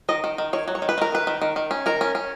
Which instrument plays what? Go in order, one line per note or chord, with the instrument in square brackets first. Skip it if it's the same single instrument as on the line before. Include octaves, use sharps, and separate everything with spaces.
[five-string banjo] D#3 D#5
D#3
D#3
D#3 C#5
F#3
C#5
D#3
B4
D#3 A#4
D#3 B4
D#3
D#3
D#3
C#4
D#3 A#4
C#4
C#4